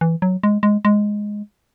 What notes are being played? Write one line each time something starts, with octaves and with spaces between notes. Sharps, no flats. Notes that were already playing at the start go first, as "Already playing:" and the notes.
E3
F#3
G#3
G#3
G#3